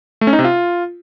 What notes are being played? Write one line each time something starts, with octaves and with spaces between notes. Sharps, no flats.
A3
C#4
D#4
C3
F4